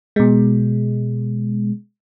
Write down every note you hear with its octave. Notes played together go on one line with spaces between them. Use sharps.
B2 G#3